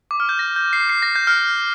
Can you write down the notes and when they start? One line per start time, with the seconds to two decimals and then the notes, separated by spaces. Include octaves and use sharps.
0.11 D6
0.20 F6
0.29 G6
0.39 A#6
0.56 G6
0.73 C7
0.89 C7
1.02 A#6
1.16 G6
1.27 F6